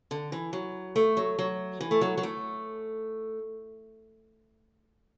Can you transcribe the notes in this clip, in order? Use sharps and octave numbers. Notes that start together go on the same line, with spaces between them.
D3
E3
F#3
A3
F#3
F#3
E3
A3
F#3
F#3
A3